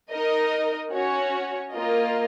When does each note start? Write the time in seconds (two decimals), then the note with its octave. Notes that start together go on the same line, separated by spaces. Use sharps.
0.10 D#4 A#4 D#5
0.92 C#4 F#4 C#5
1.72 A#3 F4 A#4 D#5